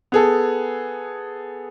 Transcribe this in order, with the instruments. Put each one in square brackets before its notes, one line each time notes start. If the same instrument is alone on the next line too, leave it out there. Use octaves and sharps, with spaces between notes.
[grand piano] B3 G#4 A4